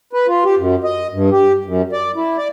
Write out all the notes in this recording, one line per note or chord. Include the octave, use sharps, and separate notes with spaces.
B4
F4
G4
F#2
D#5
G2
G4
F#2
D5
E4
D5